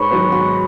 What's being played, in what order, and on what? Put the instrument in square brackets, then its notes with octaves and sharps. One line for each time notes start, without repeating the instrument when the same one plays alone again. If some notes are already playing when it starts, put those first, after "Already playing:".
Already playing: [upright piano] G#2 [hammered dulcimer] B4 C#5
[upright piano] D#3 F#3 B3
[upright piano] G#2 [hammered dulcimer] F#4